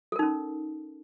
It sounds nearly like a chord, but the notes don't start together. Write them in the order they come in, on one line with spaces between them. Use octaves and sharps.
A4 A#4 D#4 C#4